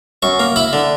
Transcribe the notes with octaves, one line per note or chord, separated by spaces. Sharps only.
F#2 C#6
A#3
E4 B5
D3